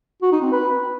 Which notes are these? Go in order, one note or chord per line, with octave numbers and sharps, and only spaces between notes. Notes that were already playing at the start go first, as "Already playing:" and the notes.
F#4
D#4
C4
B4